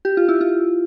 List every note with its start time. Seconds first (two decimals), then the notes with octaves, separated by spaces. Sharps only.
0.05 G4
0.17 F4
0.29 E4
0.41 F4